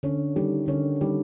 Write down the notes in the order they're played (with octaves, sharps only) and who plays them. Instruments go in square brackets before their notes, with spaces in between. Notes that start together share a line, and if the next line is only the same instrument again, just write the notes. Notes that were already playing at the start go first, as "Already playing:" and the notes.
[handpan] D3 [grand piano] C#4
[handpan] D#3 [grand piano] G3
[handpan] D3 [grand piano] C#4
[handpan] D#3 [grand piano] G3